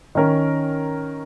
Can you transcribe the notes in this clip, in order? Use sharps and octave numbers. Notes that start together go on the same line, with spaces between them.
D#3 C#4 A#4